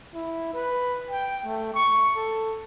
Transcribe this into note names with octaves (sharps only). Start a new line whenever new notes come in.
E4
B4
G5
A3
C#6
A4